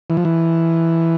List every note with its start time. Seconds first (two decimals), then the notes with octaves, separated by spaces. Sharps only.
0.10 E3
0.17 F3
0.25 E3